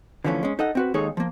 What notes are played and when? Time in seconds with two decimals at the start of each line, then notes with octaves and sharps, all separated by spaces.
0.24 D3 E3 F3 A3 C#4
0.43 G#3 C#4
0.59 D#4 A4 D#5 F#5
0.75 C4 F#4 B4
0.94 D#2 G#3 D#4 G#4 A4 C#5
1.17 F3 A#3